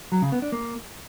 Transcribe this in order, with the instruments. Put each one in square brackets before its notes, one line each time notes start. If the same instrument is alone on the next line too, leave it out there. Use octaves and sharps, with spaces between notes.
[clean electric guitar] F#3
C#3
B3
D4
A#3